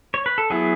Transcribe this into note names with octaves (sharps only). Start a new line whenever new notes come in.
C#5
B4
A4
F#3 B3 E4 G#4